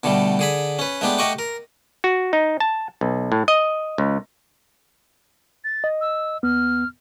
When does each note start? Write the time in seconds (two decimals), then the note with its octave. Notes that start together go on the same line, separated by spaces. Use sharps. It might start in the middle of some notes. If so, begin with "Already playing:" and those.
0.04 B2 D3 G3 A3
0.39 D3 G#4 B5
0.79 C#4 B4
1.01 G#3 A3 B3 D4 G4
1.18 A3 G4 D#5 F#5 C#6 D6
1.39 A#4
2.04 F#4
2.33 D#4
2.60 A5
3.01 B1
3.32 A2
3.48 D#5
3.98 C#2
5.64 A6
5.84 D#5
6.01 E6
6.43 D#2 B3 F6